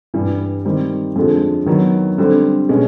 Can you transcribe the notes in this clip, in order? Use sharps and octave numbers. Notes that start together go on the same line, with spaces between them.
G2 E3 G3
D#3 G3 C4
F2 D3 F3 G#3
D#3 F#3 B3
D3 G3 C4
B2 G#3 C#4